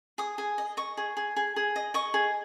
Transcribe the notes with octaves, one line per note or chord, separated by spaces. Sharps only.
G#4 D#6
G#4
D#5
D#5 C#6
G#4
G#4
G#4
G#4
D#5
D#5 C#6
G#4